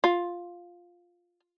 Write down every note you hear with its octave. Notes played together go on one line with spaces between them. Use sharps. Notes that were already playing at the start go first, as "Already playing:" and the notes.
F4